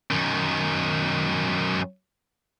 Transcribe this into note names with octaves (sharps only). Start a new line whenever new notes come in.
F#2 D#3